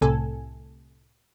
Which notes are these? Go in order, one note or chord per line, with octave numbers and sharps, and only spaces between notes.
C2 A2 C3 A4 G#5